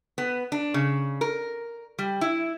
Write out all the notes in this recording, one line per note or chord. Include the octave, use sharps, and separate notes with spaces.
B3
D4
C#3
A#4
G3
E4